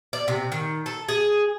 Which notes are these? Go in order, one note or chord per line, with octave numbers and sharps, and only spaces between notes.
D5
C3
D#3
A4
G#4